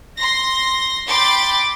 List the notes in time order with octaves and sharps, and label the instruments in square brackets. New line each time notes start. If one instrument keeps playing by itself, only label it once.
[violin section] C6 A#6
G5 B5 C6 D6 A6